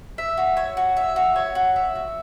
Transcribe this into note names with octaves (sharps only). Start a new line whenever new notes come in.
E5
F#4
C#5
F#4
E5
F#4
C#5
F#4
E5
F#4